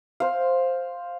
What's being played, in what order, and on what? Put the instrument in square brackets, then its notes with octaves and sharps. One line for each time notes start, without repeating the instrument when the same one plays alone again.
[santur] C5 F5